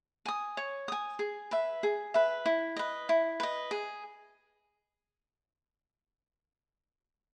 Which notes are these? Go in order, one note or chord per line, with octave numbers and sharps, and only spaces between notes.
G#5 D#6
C#5
G#5 D#6
G#4
B4 E5
G#4
B4 E5
E4
B4 D#5
E4
B4 D#5
G#4